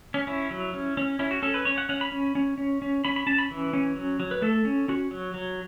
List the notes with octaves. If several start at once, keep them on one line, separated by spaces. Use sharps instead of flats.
C#4
C#4 E4
F#3
C#4
C#4
C#4 E4
F#4
C#4 A4
B4
C#4 C#5
F#5
C#4 F#5
B5
C#4
C#4
C#4
C#4
C#4 B5
B5
C#4 A5
B5
E3
C#4
F#3
F#3
B4
A3 A4
C#4
C#4 F#4
F#3
F#3